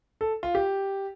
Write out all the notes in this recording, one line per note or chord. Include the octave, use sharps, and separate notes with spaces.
A4
F4
G4